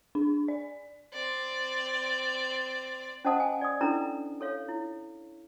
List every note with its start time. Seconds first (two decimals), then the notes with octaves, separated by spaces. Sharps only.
0.15 D4
0.48 D5
1.13 C4 D5
3.25 C#4 C5 D#5 F#5 A5 D#6
3.40 G#5
3.61 D5 D#6
3.81 C#4 D4 E4 A4 B4 A#5
4.41 A4 C#5 F5
4.68 E4